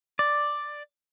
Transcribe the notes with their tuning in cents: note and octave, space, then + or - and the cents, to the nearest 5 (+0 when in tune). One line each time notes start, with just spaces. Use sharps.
D5 +5